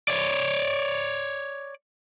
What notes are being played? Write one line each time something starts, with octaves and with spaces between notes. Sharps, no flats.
C#5 D5